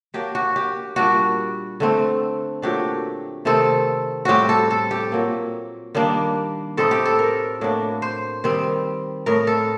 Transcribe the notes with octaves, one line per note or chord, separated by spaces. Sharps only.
F#3 A#3 D4 G4
F#4
G4
A#2 G3 D4 F#4
D3 A3 C4
A#2 F#3 A3 D4 G4
C3 D#3 A3 C4 A4
A2 G3 C4 F#4 G4
A4
A4
G4
A#2 F#3 A#3
D#3 G3 A#3 D4
A2 A3 C4 D#4 A4
G4
A4
A#4
A2 F#3 A#3 D4
C5
D#3 G3 C4
A2 A3 D#4 A#4
A4